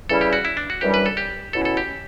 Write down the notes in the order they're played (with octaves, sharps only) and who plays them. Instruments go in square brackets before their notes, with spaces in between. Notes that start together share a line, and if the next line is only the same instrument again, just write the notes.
[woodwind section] C#3 E3 G3 C#4 E4 [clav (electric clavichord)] A4
[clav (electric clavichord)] G4
F#4
E4
D4
F#4
[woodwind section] F#2 E3 G3 D4 [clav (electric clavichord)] G4
[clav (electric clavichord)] B4
A4
G4
[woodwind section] B2 F#3 C#4 E4 [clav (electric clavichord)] A4
[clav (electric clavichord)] A4
G4